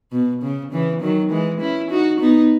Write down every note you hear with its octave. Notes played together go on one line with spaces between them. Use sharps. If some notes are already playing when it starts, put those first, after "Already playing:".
B2
C#3
C#3 E3
D#3 F#3
E3 G#3
C#4 E4
D#4 F#4
B3 D#4